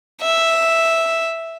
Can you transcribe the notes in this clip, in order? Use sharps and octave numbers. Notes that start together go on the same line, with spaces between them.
E5